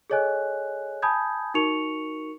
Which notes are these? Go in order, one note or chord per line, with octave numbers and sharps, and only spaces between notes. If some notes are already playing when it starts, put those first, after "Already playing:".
G#4 A4 C#5 D#5 G#5 F#6
G#5 A5 B5 D#6 G6 G#6
D#4 F#4 A#4 C#6 C#7 F7